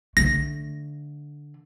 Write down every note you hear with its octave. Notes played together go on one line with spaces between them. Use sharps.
D3 A3 A#6